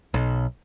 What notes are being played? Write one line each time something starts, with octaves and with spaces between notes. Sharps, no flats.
B1